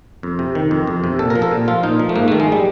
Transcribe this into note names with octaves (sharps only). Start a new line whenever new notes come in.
F2
C3
D#3
F2
F2
C3
A#2 A4
A#4
F3
A4
A#2
F3 F4
A#2 D#4
F3
A3
G#2 A#3
D#3 A3
G#3
G3